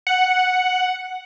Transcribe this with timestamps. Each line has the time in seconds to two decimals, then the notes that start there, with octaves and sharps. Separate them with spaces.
0.07 F#5